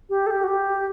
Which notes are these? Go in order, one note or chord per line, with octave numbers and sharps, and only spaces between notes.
G4
A4
G4
F#4
G4